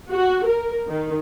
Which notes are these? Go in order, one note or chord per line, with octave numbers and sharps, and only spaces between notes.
F#4
A#4
D#3